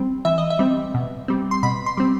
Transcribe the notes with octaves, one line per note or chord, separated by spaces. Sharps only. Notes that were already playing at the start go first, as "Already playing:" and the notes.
Already playing: G3 C4
E3 E5
D#5
E5
G3 C4
B2
G3 C4
C6
B2 B5
C6
G3 C4